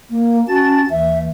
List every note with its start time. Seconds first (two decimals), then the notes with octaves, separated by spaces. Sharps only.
0.10 A#3
0.48 C#4 F#4 A5 A6
0.90 D#2 E3 E5